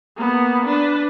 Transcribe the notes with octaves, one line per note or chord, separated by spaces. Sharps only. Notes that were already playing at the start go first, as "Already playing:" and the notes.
A#3 B3
D4 B4